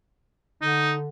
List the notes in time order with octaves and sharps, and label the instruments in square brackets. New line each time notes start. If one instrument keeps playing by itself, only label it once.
[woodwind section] D3 [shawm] D#4